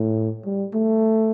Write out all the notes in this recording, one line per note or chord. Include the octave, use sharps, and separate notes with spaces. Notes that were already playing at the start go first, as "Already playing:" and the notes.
Already playing: A2
G3
A3